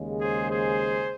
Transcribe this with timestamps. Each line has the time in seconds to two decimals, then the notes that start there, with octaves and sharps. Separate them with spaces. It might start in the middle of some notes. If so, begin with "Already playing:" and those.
Already playing: D#2 C#3 G#3
0.21 G#4 C5
0.50 G#4 C5